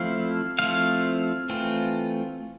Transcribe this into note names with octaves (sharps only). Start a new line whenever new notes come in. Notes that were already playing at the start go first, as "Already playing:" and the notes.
Already playing: F3 A3 C4 E4 F5
F3 A3 C4 E4 F5
E3 A3 C4 F4